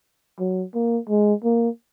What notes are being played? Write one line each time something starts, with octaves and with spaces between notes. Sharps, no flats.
F#3
A#3
G#3
A#3